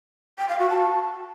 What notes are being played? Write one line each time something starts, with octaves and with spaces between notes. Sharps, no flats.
G5
F5
F#4
A5